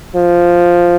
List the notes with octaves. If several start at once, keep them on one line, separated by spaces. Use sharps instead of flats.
F3